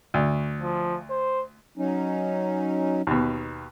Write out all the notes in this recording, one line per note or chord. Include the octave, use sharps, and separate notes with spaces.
D2
F3
C5
F#3 C#4 D#4
D#2 B2